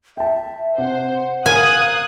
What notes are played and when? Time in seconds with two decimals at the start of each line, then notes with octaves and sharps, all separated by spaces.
0.17 E5 G5 A5
0.78 C3 C5 F#5
1.46 A#4 F5 G#5 D#6 F#6